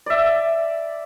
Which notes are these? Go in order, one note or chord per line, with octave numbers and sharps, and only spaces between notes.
D5 E5